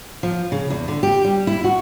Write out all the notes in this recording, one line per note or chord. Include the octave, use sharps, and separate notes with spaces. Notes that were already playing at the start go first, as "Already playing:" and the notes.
F3
C#3
E2
D3
G4
G3
E4
F#4